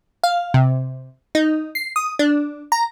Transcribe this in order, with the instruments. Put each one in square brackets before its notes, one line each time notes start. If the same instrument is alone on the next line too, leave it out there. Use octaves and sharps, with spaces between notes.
[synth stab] F5
C3
D#4
C7
D#6
D4
A#5